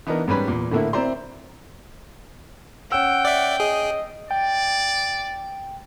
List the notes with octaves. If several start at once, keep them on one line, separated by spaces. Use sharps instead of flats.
E3 B3 D4 D#4 A#4
G#2 G3 C#4 B4 B5
E2 A#2
A2 D3 A3 A#3 E4
C4 E4 C5 D5 A#5 C6
C#4 F#5 G5 E6
D5 E5
G#4 D#5
D5 G5